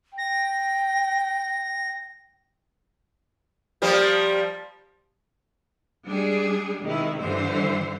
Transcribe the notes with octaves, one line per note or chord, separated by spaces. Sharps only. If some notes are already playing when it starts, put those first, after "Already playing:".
G5 A#6
F3 G3 A#3
G3 G#3 D4 G#4
C3 D#3 G#3 E4
G2 D3 E3 C5